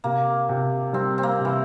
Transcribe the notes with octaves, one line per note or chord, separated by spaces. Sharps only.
C3 A#3
C3
G3 C4
C4
A#3
C3
E3